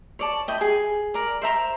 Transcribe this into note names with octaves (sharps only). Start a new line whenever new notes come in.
C#5 D5 A5
E4 D#5 G5
G#4
A#4 D5
C5 E5 A#5 C6